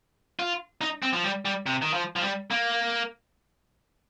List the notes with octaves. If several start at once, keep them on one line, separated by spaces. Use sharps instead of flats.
F4
D#4
C4
F3
G3
G3
C3
D#3
F3
F3
G3
A#3